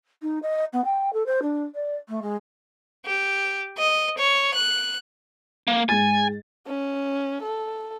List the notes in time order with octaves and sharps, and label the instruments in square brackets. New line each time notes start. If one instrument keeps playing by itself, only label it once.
[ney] D#4
D#5
B3
G5
A4
C5
D4
D5
A3
G#3
[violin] G4
D#5
C#5
F#6
[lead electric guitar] A#3
[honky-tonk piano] G#2 A6 [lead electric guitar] G#5
[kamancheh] C#4
A4